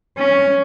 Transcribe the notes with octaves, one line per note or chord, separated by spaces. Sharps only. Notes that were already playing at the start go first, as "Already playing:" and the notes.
C#4